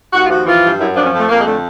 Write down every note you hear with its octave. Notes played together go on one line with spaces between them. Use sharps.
D#2 F#4
F4
F3 F#4
E3 F4
G2
F#2 E4
F3 D4
C#4
F2
A3
F2 A#3
G#3
D3 A3